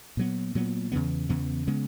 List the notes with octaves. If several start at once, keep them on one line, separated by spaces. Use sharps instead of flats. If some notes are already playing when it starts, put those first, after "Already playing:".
A#2 F#3 B3
A#2 F#3 B3
E2 C#3 E3 B3
E2 C#3 E3 B3
C#3 G#3 B3